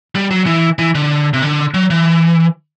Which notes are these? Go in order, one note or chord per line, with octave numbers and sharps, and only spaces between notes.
G3
F#3
E3
E3
D3
C3
D3
F#3
E3